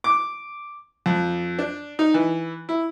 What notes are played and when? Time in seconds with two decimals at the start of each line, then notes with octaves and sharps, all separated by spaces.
0.04 D6
1.06 F2
1.59 D4
1.99 D#4
2.14 E3
2.69 E4